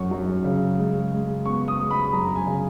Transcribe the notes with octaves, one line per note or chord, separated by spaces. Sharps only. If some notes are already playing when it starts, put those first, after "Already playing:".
Already playing: F#2 F#3 C#6
F#2
C#3
G#3
G#3
B3 C#6
D#6
G#3
B5
F#2 A#5
G#5
C#3